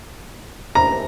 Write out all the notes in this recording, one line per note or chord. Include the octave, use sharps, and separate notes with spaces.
A#5